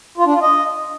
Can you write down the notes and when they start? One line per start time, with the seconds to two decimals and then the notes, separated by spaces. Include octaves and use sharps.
0.18 F4
0.26 D4
0.34 F4
0.42 D#5